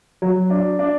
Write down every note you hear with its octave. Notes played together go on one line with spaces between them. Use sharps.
F#3
D4
D4